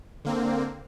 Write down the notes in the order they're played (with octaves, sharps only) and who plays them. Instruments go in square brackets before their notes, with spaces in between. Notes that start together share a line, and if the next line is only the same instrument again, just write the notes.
[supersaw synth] D3 A#3 C4